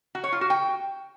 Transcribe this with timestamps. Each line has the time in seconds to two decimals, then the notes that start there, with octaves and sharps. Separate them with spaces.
0.15 F#4
0.24 C#5
0.32 F4
0.41 F#4
0.50 G5